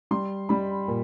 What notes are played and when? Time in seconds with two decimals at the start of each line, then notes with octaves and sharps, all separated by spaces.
0.11 G3 C6
0.49 G3 B5
0.88 A#2